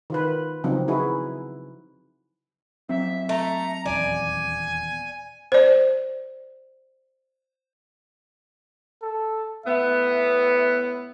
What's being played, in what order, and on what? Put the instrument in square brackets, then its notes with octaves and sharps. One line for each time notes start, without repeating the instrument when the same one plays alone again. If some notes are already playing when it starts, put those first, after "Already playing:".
[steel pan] D#3 F4 B4
C#3 F3 F#3 C4 D#4
D#4 E4 F#4 G#4 B4
[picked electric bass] F#3 C4 [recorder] E5
[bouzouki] A3 [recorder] A#5
[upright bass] D#1 E2 [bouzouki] D5 [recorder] G#5
[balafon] C5 D5
[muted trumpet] A4
[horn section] A2 B3 [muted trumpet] E5